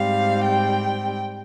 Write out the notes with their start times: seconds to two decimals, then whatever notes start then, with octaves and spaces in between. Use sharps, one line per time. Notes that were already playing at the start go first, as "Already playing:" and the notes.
Already playing: G#2 G3 C4 F5
0.44 G5